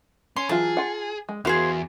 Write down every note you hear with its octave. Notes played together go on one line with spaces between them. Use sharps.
C#4 C6
E3 F#3 F4 G#4 A5
F4 F#5
G#3
E2 E4 F#4 G#4 A#4 C5 F5